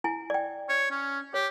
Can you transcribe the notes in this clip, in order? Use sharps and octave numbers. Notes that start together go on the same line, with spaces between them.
E4 G#5
D5 G5
C#5
C#4
G4 C#5